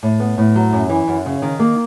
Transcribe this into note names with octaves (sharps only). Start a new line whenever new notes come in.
A2
B3
A2
F#3
F#2
E3
F#2
C#3
D#3
A#3